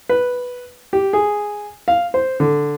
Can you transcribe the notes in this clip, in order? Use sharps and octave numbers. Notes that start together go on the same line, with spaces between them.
B4
G4
G#4
F5
C5
D3